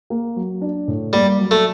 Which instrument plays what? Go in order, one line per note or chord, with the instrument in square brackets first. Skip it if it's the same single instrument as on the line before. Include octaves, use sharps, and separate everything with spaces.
[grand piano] A#3
F#3
D4
A2
[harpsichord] G3 [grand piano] A#3
[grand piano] F#3
[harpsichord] A3